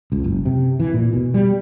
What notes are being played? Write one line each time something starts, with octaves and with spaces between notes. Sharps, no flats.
C#2
F#1
C3
E3
A#2
B2
G3